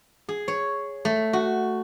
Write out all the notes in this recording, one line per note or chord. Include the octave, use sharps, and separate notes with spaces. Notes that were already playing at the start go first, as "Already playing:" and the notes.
G#4
C#5
A3
F#4